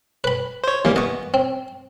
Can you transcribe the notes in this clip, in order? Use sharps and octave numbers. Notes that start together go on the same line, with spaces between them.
B4 B5
C5 C#5
E3 G3 A#3
B3 D#5 C#6
C4